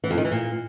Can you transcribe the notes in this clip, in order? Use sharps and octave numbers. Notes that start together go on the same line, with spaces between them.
E3
F2
D#3
E3
A#2